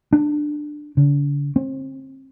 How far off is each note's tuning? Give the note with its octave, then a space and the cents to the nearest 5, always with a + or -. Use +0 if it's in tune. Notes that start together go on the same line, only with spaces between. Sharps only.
D4 +15
D3 -40
C4 +35